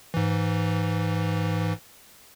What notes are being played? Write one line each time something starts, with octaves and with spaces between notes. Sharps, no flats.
G#2 E3